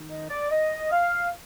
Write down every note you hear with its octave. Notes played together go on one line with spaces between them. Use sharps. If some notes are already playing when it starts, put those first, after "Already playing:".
Already playing: D#3 D#4
D#5
D5
D#5
F5